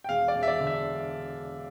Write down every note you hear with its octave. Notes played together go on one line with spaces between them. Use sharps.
G5
E1 F5
D5
E1
E5
D5
D3
E5